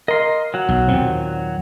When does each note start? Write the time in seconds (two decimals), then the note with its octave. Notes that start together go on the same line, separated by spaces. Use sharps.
0.08 A#4 D#5 C6
0.54 F#3 F#4
0.69 B1
0.88 D#2 A#2 C4